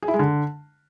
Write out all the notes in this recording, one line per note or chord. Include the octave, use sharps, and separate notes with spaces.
G#4
E4
G#3
D3